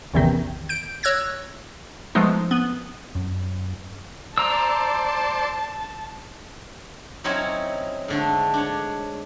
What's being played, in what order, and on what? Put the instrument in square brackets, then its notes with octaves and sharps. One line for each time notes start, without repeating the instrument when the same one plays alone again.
[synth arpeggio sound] A1 E2 C3 D#3
G6 D7
C#5 E6 F#6 G#6 A#6
F3 G#3 A3 B3 D#4
B3
[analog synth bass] F#2
[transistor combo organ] C5 D5 [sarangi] A5 [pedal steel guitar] A#5 E6
[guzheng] F#3 C4 C#4 D#4 E4 C#5
G#2 D3 A3
D4 C#5